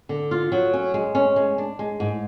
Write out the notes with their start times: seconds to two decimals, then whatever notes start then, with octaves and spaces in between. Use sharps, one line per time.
0.09 D3
0.31 F4
0.52 F#3
0.74 C#4
0.94 G#3
1.15 C#4
1.36 G#3
1.58 D4
1.79 G#3
2.00 G#2